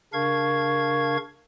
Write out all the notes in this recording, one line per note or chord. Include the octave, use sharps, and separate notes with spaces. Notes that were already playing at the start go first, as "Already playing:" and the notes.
C#3 D4 A#4 F5 C#6 G#6